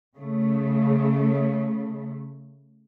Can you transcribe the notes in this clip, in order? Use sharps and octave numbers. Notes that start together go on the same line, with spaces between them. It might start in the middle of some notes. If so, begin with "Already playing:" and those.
C#3 A3